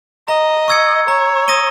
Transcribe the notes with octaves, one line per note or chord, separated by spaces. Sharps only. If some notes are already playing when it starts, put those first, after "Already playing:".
D#5 A#5
C#6 E6 G#6 C#7
C#5 A#5
D#6 A#6 D#7 G7